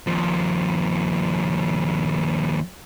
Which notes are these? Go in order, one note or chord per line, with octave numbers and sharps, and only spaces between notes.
D#2 F3